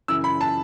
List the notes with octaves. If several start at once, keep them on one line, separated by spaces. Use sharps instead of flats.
F#2 C#3 E3 E6
B5
A5